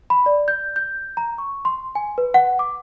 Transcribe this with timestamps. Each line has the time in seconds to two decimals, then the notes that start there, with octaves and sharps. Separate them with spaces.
0.10 B5
0.26 D5
0.48 G6
0.76 G6
1.17 A#5
1.38 C#6
1.65 C6
1.95 G#5
2.18 B4
2.34 F#5
2.59 D6